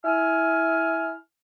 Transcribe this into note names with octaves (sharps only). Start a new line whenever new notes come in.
E4 G#5 F6